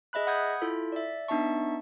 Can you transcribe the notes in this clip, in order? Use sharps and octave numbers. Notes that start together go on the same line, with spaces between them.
G#4 D#5 E5 B5 F#6
F#5 B5 D#6 G6 G#6
E4 F4 A4
D5 E5
B3 D4 D#4 E5 A5 C#6